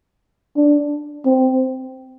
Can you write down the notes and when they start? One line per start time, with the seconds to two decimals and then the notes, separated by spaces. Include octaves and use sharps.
0.56 D4
1.25 C4